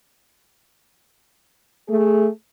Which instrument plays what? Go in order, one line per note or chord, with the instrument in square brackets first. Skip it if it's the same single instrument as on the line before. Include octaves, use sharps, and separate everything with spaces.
[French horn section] A3 G#4